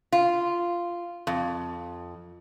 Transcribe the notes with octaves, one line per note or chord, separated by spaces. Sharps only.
F4
F2